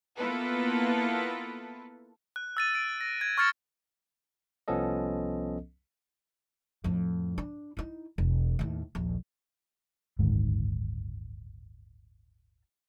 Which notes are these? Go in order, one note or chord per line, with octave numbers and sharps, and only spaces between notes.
A#3 B3 E4 F4 A4 B4
F#6
E6 A6 D#7
D7
A#6
G#6
C#6 F6 A6 C#7 E7
C2 F3 B3 C#4 A4 D#5
F2 A2
D4
D#4 E4
E1
D#2 A2
D#1 A#1
D1 G1 G#2 D#3